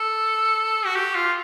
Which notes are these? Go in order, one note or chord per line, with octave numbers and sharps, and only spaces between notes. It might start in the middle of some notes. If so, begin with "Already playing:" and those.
Already playing: A4
F#4
G4
F4